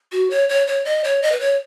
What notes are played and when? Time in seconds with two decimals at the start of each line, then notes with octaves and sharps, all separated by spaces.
0.12 F#4
0.30 C#5
0.49 C#5
0.67 C#5
0.85 D#5
1.04 C#5
1.22 D#5
1.32 B4
1.40 C#5